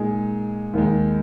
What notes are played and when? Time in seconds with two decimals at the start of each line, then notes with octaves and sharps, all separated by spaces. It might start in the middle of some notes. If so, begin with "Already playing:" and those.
Already playing: A#2 G#3 D#4 G#4
0.73 D#2 D#3 G#3